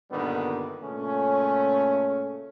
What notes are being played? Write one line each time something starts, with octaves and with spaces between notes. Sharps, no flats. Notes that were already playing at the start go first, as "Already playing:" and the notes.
G2 A#2 D3 D#3 G3 B3
A#2 C#3 A3 C#4